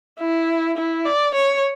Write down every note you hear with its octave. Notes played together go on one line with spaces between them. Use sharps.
E4
E4
D5
C#5